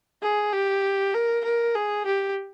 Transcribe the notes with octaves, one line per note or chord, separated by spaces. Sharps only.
G#4
G4
A#4
A#4
G#4
G4